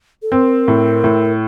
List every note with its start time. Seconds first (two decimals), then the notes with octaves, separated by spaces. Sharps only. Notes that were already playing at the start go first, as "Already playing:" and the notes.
0.22 A4
0.32 C4 A#4
0.68 A2
1.04 A2